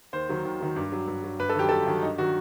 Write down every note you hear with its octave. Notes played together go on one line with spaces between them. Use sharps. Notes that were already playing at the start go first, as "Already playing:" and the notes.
D#2 C5
D#3 F#3
D#2
D#3 F#3
G2
F#3
G2
F#3
G2 B4
A4
D#3 F#3 G4
G2 A4
D#3 F#3
G2 D#4
D#3 F#3 F#4